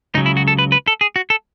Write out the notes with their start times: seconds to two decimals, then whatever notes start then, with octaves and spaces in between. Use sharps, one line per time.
0.15 C#2 C#3 F#3 D#4
0.26 E4
0.37 F#4
0.48 A4
0.59 B4
0.72 B4
0.88 A4
1.01 G#4
1.16 F#4
1.30 A4